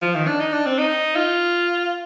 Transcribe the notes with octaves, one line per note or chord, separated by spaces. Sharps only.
F3
D#3
D4
D#4
D4
C4
D#4
F4